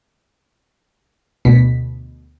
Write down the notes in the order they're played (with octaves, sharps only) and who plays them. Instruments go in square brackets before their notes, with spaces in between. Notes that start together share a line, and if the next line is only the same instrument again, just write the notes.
[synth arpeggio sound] D2 B2 B6